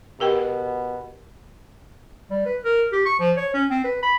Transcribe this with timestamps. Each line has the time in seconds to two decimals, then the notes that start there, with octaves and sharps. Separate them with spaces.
0.20 B2 G4 A#4 G5
2.31 G3
2.46 B4
2.64 A#4
2.93 G4
3.05 C#6
3.19 F3
3.37 C#5
3.54 C#4
3.70 C4
3.84 B4
4.03 B5